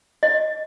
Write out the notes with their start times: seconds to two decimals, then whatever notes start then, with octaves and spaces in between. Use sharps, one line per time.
0.23 D#5